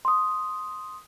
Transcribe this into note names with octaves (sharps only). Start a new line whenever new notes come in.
C6 D#6